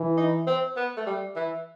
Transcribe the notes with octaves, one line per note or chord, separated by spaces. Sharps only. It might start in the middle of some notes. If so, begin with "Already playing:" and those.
Already playing: E3
D#4
C4
B3
A3
G3
E3